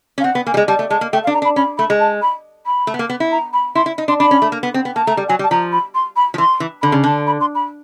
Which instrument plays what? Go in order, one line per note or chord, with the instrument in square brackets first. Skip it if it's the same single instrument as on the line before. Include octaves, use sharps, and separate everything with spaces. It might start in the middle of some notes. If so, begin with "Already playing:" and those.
[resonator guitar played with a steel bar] C#4
[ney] F5
[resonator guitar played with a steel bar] C4 [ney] F#5
[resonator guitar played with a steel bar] B3
[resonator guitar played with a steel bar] A#3 [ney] G#5
[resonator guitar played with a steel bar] G3
G#3
[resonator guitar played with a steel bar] G3 [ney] A5
[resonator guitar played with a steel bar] A3
[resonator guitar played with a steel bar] G#3 [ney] A5
[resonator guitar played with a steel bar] A#3
[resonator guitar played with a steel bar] A3 [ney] G5
[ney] F5
[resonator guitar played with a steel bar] D4
[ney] A#5
[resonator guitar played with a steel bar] D4
[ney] B5
[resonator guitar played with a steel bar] C#4 [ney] B5
[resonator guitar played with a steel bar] A3 [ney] B5
[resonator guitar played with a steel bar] G#3
[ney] A5
B5
B5
[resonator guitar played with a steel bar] A3
B3
A#3
B3
E4
[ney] A#5
B5
[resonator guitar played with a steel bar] E4 [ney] C6
[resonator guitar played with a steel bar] E4
D#4
[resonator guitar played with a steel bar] D4 [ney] C6
[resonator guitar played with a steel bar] D4 [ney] B5
[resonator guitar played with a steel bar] C#4
A3
A#3
B3
C4
B3
[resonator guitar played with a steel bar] A#3 [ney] A5
[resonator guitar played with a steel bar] A3 [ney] A#5
[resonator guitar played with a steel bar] G3
[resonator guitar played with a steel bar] F#3 [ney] G#5
[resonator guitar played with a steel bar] G3
[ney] A5
[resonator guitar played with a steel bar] F3 [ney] A#5
[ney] B5
C6
B5
[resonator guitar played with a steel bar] F3
[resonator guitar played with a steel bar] E3 [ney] C6
[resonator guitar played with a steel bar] E3
[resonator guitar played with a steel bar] D3 [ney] B5
[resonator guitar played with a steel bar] C#3
[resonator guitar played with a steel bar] D3 [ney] A5
[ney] B5
C6
B5